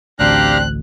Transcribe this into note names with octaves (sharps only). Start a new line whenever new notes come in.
A1 D2 C4 D4 G4 F5 A#5 F#6